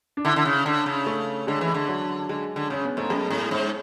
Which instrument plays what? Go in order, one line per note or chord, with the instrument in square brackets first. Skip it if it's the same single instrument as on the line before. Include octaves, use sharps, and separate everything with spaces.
[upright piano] D4
[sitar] D3 [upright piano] E4
[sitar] D3
C#3
D3
C#3
[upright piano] A3
[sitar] D3 [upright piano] G#3
[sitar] E3
[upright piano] G#3
[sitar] D3
[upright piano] F#3
[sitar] D3 [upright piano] G#3
[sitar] D3
[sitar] C#3 [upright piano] C#4
[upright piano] B3
[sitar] G#2 [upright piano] A3
[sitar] F#2 [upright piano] G#3
[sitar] A2
[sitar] G#2 [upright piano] C#4